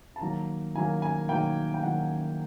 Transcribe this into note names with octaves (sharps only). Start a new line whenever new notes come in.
A5
D#3 F#3 A#3 A#5
D#3 F#3 A#3 G#5
G#5
D#3 F#3 A#3 G5
G5
D#3 F#3 A#3 F#5